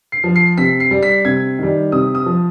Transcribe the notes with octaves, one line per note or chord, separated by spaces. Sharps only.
C7
F3
C7
C3 B6
C7
G3
B6
C3 G#6
D#3 G3
C3 D#6
D#6
F3